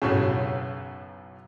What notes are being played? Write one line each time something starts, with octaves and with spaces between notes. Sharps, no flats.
B1 F#2 A2 C#3